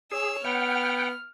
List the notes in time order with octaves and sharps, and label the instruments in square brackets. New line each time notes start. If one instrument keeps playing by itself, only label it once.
[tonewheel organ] G#4 [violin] C#5 E6
[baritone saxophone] B3 [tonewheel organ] F#5 G5 [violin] F6